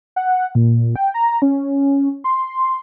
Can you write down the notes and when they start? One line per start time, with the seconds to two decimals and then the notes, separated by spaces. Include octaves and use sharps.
0.16 F#5
0.55 A#2
0.96 G5
1.14 A#5
1.42 C#4
2.24 C6